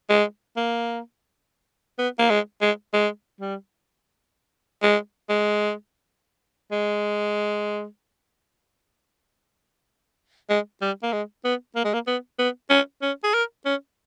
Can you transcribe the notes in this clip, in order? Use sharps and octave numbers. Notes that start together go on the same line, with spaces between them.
G#3
A#3
B3
A#3
G#3
G#3
G#3
G3
G#3
G#3
G#3
G#3
G3
A#3
G#3
B3
A#3
G#3
A#3
B3
B3
C#4
C#4
G#4
A#4
C#4